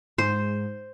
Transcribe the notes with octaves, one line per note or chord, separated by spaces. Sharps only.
G#2 C5